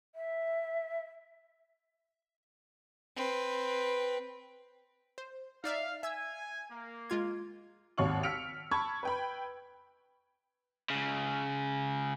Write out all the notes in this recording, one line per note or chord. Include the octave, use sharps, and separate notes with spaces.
E5
C4 B4
C5
D#4 D5 E5 F5
E5 G#5 E6
A#3
G#3 F4 G#6
G#1 D#2 C#5 F5 C#6 F#7
E6 F6 B6 C#7 D7 F7
A5 B5 C#6 G#6
B4 G5 B5
C#2 C#3